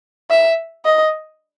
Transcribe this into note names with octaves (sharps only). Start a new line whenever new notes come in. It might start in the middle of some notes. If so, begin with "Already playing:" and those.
E5
D#5